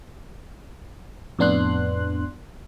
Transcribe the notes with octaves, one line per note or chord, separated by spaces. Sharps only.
F2 A2 B3 D4 C6 F#6